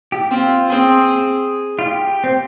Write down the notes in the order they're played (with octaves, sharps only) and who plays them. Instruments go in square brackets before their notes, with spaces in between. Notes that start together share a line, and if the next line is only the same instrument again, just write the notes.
[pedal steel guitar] G4
[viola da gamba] C4 [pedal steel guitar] F4
[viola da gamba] C4 [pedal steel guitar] G#4
[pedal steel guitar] F4
G4
C4